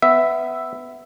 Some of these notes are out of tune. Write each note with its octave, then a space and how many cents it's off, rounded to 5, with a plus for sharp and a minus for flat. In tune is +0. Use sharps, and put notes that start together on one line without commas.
B3 +20 E5 +0